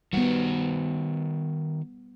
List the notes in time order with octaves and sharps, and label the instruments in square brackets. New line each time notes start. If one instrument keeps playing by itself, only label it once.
[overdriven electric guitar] D#3 F#4 [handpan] G3 B3